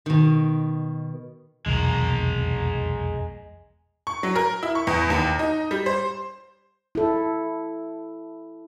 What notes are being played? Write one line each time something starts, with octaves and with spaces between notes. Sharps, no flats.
B2 D#3
F1 B1 E2 G#3 A#4
C#6
F#3
A#4
E4
C#6
E2
D#2
D#4
G3
C5
E4 A4